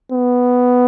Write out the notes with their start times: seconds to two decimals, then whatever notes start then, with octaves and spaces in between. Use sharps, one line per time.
0.12 B3